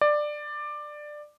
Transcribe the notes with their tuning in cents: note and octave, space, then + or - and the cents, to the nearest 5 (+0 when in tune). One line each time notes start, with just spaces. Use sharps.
D5 +15